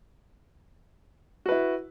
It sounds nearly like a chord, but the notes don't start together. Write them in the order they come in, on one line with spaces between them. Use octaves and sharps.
F#4 B4 E4